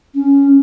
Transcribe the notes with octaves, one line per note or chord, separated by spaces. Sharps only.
C#4